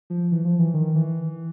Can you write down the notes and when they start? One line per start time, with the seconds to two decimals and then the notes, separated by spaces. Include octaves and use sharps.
0.10 F3
0.32 E3
0.45 F3
0.59 E3
0.74 D#3
0.95 E3